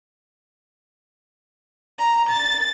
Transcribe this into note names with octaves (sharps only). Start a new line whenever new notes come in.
A#5
A6